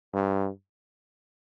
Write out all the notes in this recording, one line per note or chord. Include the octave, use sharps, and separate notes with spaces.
G2